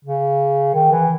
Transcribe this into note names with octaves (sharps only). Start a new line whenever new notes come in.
C#3
D#3
E3